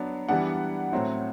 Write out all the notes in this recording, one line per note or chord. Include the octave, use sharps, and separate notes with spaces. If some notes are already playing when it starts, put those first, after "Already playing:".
Already playing: F#3 B3 D4
E3 G3 B3 D4 F#5
A2 F#3 C4 E4